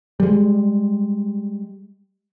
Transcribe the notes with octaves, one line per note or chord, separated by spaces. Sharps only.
G3 G#3